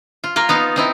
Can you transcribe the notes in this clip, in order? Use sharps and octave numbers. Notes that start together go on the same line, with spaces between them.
F4
A#3 F4 A#4
B3 D#4 F5
C4 D#4 E4